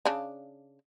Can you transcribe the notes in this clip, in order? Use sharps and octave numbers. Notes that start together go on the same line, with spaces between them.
C#3 D4